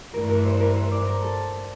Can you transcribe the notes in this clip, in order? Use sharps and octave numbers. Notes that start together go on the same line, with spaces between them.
G2 E3 A3 A#4
A#4
C5
A#4
C5
D5
A#4
A4